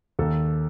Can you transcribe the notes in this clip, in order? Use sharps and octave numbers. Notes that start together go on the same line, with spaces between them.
D#2 A4